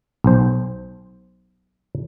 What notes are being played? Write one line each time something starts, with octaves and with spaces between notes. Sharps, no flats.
B1 C5